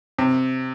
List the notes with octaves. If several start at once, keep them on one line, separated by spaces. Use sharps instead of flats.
C3